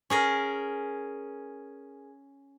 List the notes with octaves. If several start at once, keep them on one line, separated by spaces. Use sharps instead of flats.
C#4 G#4 A#4